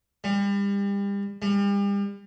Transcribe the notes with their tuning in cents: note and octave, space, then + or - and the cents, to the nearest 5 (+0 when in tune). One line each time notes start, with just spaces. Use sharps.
G3 +35
G3 +40